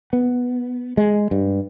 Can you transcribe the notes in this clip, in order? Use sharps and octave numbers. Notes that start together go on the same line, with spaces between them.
B3
G#3
G2